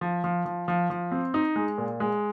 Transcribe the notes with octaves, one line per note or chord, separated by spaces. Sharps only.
F3
F3
F3
F3
F3
C4
D#4
G#3
A#2
G#3